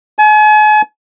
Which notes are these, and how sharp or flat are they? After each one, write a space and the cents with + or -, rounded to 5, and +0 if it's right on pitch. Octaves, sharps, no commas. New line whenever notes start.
G#5 +40